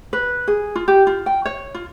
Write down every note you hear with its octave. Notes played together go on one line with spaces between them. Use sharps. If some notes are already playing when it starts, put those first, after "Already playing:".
B4
G#4
F4
G4
F4
G5
C#5
F4